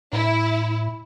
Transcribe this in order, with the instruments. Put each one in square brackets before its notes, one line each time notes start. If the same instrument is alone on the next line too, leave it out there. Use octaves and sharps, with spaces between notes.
[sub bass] A2 [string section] E4